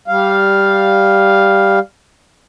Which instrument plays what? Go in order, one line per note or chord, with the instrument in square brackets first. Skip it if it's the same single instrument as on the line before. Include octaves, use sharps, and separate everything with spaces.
[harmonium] G3 F5